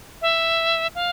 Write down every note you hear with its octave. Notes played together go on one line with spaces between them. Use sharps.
E5
F5